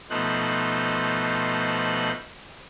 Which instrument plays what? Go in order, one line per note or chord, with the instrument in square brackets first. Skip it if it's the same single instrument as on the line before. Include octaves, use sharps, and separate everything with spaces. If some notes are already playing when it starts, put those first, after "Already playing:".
[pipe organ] B2 F3 A3 D#4 C5 F#6